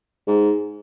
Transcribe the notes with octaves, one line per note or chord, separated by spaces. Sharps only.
G#2